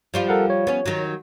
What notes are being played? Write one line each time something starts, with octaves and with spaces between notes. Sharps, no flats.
F3 G3 F4
A4 A#4 F#5
C#5
B3 C#4
D#3 F#3